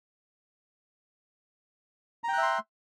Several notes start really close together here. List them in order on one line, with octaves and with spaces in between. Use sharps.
A#5 G5 F#6 E5 C6